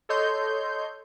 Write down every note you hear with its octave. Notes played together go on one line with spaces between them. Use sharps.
A4 C#5 D#5 C6 G6